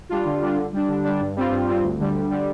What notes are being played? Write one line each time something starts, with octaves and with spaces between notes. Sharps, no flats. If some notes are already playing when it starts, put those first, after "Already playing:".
G3 D4 F4
D3
G3 D4 F4
D3
G3 D4
D3
G3 D4
G2
G3 C4 F4
G2
G3 C4 F4
D2
D3 G3
D2
D3 G3